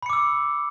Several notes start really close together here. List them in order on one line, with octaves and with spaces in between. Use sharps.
B5 C#7 D6 E6